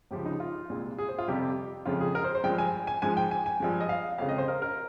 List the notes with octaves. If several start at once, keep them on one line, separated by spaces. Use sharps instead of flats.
C#2 C#3 F3 G#3 G4
D#4
F4
C2 A#2 G#3
G#4
C5
F4
F2 C3 G3 G4
F2 C#3 F3 G#3 F4
G#4
A#4
C5
C5
G2 F3 G#3 G5
G#5
G#5
G#2 F3 G#3 G#5
G5
G#5
G#5
G2 F3 G#3
D#5
F5
F2 C#3 G#3 F5
D#5
C5
A#4
A#4